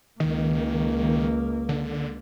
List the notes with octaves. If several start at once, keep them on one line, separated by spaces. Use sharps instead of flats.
C#2 D#3 A#3
D3